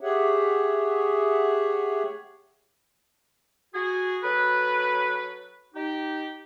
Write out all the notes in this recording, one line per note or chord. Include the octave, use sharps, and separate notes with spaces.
G4 G#4 C#5 E5 F#5
F#4 G#4
F#3 A4 B4
D#4 G4